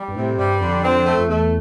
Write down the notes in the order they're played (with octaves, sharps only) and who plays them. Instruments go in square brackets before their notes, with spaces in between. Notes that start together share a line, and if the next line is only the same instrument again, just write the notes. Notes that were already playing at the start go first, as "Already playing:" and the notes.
Already playing: [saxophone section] G3
[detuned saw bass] G2
[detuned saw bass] A2 [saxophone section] C3
[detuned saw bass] G2 [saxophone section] G3
[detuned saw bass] F2 [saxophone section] D3
[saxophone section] C4
A3
[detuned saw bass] F2
[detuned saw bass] E2 [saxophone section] A3